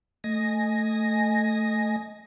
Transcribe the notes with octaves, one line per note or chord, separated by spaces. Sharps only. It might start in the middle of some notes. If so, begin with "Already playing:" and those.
A3 D#5 G#5 A#6